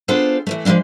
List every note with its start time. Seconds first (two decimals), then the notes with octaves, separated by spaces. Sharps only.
0.08 B3 D4 F4 G#4 A4 C5
0.47 E3 F3 A3
0.65 F3 G#3 A#3 C4 D4